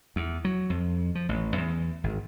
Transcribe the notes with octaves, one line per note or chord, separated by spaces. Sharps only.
E2
F#3
F2
F3
A1
E2
G#1